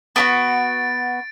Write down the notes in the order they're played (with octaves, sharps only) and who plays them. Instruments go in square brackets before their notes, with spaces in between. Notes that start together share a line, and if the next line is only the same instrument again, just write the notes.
[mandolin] B3 D4 F#4 [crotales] A6 D7